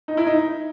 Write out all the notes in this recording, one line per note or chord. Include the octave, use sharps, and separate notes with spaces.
D#4
E4
D#4